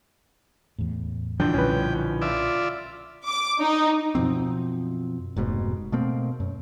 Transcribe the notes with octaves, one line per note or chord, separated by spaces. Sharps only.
E2 A2
D3 E3 F3 D4 G5
B1 A#2 G3 C#4 B4
F4 D5 E5
D6
D#4
F#2 B2 F3 C4
F1 G#2 B2 A3
B2 A3 A#3 C4
F#2